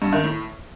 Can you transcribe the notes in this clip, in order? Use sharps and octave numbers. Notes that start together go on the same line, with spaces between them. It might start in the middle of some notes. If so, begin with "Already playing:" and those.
G2
D#3
A2